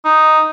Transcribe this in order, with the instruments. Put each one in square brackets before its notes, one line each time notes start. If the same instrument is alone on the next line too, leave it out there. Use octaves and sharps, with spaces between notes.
[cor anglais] D#4